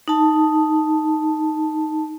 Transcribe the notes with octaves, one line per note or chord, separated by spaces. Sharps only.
D#4 A5